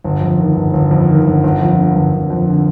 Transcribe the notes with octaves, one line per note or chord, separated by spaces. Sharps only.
G1
F2
D#3
G1
G1
F2
D#3
G1
G1
F2
D3
G1
G1
F2
D3